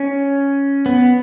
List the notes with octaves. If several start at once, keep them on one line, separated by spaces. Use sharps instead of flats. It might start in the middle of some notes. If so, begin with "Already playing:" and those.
Already playing: C#4
B3